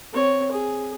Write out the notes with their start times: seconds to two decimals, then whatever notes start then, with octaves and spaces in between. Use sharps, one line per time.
0.13 C4 C#5
0.52 G#4